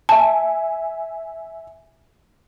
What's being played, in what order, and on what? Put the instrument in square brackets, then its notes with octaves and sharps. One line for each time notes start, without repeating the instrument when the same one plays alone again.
[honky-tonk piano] E5 G#5 [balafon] A5